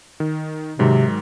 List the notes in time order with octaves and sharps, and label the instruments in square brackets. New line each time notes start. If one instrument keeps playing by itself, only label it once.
[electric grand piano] D#3
[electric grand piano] G#2 D#3 F#3 [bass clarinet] C3